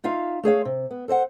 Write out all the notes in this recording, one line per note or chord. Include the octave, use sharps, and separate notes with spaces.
D#4 F4 E5 F5
A3 G#4 C#5 F5
C3
B3
A4 C5 D#5 F#5